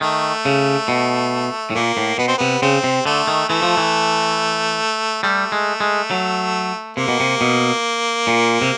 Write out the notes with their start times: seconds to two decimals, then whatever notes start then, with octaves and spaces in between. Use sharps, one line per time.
0.01 D#3 A3
0.45 C#3
0.88 B2
1.70 A2
1.75 A#2 A#3
1.97 A2
2.18 B2 B3
2.28 C4
2.37 C3 B3
2.62 C#3 C4
2.84 C3
3.06 D3 A3
3.27 D#3
3.49 E3 A3
3.62 F3
3.77 E3
5.23 G3 A3
5.52 G#3
5.80 G#3
6.11 F#3
6.97 C3 A#3
7.08 B2
7.20 C3
7.41 B2
8.27 A#2
8.62 C3